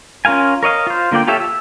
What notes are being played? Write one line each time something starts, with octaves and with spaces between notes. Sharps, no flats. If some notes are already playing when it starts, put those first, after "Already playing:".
C#4 F4 A#4 F5 G#5
A#4 C#5 D#5 F5
F4 C5
D3 A#3 F4 D5 G5
F4 G4 A4 C#5 E5
E6